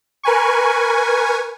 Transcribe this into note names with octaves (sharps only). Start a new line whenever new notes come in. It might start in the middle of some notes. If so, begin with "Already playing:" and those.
A#4 B4 G#5 C#6